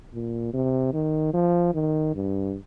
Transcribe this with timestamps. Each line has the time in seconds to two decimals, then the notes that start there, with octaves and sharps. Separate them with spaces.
0.14 A#2
0.53 C3
0.93 D#3
1.34 F3
1.74 D#3
2.14 G2